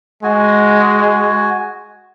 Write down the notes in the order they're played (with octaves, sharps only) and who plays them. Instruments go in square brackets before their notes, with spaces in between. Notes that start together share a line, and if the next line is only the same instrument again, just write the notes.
[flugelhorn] G#3 [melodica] F#4 G#5